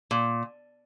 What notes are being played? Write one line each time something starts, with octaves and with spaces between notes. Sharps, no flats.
A#2